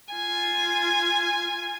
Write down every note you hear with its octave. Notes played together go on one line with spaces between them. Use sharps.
F4 G#5